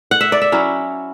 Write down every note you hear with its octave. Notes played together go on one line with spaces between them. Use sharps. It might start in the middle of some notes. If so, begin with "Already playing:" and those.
F#5
E5
D5
E5
F#3 C#4 E4